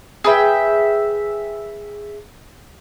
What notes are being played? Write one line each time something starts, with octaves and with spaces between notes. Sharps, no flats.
G#4 B4 E5 G5